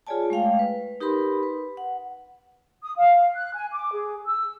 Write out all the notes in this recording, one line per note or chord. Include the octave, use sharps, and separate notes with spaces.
F4 G#4 C#5 D5 G#5 A5
G#3 A3 F5 G5
B4
D#4 G4 A#4 B4 B5 C6
B4
F#5
D#6
F5
F#6
G#5
D6
G#4
E6